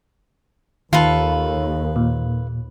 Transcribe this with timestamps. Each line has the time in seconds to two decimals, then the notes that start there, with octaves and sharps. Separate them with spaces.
0.93 D#2 D#3 F4 A4 B4
1.96 A#2